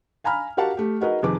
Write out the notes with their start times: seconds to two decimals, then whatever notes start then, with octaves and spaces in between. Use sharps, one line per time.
0.24 F5 G#5 A#5 B5 F6
0.57 F#4 G4 A#4 F5 F#5 A5
0.77 A3 G4
1.01 D#4 F#4 G#4 A#4 B4 D#5
1.23 F2 C3 D#3 G#4 B4 D6